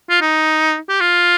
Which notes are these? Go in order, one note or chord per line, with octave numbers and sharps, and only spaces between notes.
F4
D#4
G4
F4